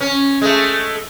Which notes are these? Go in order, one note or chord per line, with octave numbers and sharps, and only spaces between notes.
C#4
G#3 A3